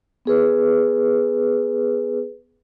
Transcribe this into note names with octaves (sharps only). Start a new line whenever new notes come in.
B3 G#4 B4